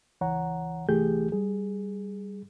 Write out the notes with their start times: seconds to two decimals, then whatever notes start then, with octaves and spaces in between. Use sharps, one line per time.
0.21 C#2 E3 C#5 F#5 A#5
0.89 C2 E3 A3 G4 G#4 G6
1.32 G3 G#4